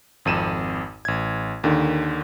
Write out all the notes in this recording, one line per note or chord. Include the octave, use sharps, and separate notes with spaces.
G#1 F2 D#7 E7
A1 G#6
D#2 D3 D#3